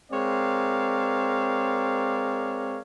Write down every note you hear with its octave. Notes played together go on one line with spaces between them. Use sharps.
G#3 C4 A#4 C#5 D5 F5